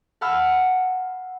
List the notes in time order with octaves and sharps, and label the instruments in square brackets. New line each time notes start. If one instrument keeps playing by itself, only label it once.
[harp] F5 F#5 A5 B5 E6 F6